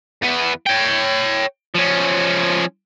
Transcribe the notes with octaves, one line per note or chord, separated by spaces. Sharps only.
E2 B3
C#5 G5
F3 C#4